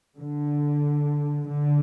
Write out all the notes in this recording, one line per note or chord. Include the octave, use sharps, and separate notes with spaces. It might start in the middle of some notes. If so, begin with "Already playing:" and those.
D3
D3